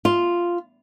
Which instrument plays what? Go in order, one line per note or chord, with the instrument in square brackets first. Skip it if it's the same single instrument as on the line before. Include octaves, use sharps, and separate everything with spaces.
[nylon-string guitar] F4